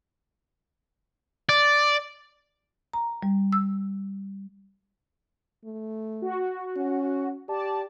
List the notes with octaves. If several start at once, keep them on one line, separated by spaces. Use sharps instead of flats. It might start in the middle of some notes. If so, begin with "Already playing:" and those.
D5
A#5
G3
E6
A3
F#4
C#4
G4 D5 A5